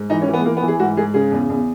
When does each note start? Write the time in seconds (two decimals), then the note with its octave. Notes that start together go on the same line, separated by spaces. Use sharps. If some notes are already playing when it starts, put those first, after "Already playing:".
Already playing: G#2
0.10 E3 D#4
0.22 C#4
0.28 E3
0.33 B3
0.39 G#3
0.44 E3 A#3
0.57 B3
0.62 E3
0.68 G#4
0.80 G#2 F#4
0.97 G#2 G#4
1.14 C#3 G#4
1.32 E2
1.49 E2